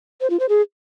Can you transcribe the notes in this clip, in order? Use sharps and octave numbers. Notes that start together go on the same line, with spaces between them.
C5
F4
C5
G#4